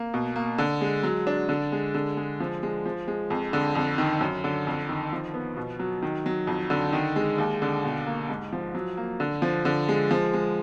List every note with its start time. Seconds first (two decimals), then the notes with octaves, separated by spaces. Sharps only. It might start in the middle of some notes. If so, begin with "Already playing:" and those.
Already playing: A#3
0.14 B2
0.36 A#3
0.58 D3
0.81 G#3
1.03 F#3
1.27 D4
1.49 D3
1.72 G#3
1.95 D3
2.17 G#3
2.40 F3
2.63 G#3
2.86 F3
3.08 G#3
3.30 F2
3.53 D3
3.75 F2
3.98 D#3
4.21 F#2
4.44 D3
4.67 F2
4.89 D#3
5.12 F3
5.34 B3
5.57 B2
5.79 F#3
6.02 D#3
6.26 F#3
6.47 F2
6.70 D3
6.93 D#3
7.16 G#3
7.38 D#2
7.62 D3
7.84 B2
8.06 A#3
8.29 G#2
8.53 F3
8.75 F#3
8.97 A#3
9.20 D3
9.42 F3
9.65 D3
9.89 G#3
10.11 F3
10.34 G#3